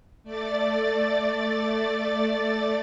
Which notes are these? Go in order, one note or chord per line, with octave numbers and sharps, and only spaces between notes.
A3 D5 A6